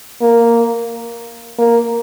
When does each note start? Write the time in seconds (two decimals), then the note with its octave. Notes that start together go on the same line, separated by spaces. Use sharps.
0.21 A#3
1.59 A#3